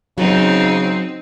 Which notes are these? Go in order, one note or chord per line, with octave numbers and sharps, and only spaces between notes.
C#3 F#3 C4 D#4 C5